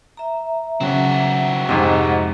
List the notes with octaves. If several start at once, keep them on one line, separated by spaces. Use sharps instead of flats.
E5 A#5
C#3 F#3 C4 F#4
F2 G#2 C3 D#5 A#5